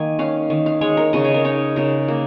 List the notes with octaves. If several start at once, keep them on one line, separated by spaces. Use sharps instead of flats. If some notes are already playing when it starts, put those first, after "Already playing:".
Already playing: D#3 A#3 G#5
C#4 F5
D#3
F5
G#3 C#5
A#4
C#3 D#5
C#5
A#4
D#4 C#5
C#3 A#4
A#3